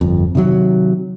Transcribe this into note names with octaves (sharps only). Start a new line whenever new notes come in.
G1 F2
C3 D#3 F3 F#3